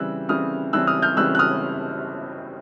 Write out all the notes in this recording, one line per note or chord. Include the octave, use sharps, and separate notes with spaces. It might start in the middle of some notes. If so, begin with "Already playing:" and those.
Already playing: C#3 E3 G3 C4 E6 F#6
C#3 E3 G3 C4 D#6 F6
C#3 E3 G3 C4 E6 F#6
D#6 F6
F6 G6
C#3 E3 G3 C4 E6 F#6
F#6
D#6 F6